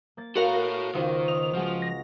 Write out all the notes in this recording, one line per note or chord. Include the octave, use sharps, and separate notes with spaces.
A#3 A6
F#4 A4 A#4 C#5 F5
C#2 D#3 C5 E6
D#5 F7
F3 G#3 F#4 F6
A#6